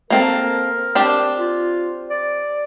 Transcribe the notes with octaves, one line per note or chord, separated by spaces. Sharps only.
A#3 C4 A4 A#4
C4 D4 G4
F4
D5